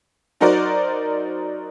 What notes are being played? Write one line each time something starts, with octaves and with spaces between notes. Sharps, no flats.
F#3 D#4 F#4 A#4 C5 D5